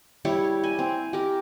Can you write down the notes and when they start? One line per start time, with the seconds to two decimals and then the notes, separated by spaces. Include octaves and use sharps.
0.25 G3 E4 C#5
0.64 G#5
0.79 C4
1.13 G4 A#4